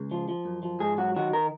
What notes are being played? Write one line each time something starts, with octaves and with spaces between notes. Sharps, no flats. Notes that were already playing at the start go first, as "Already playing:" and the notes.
Already playing: C#2 G#4
F3
F3
F#2
F3
G#2 G#4
F#3 F#4
D#3 F#4
A#4